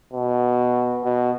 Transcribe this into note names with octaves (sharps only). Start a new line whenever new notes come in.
B2
B2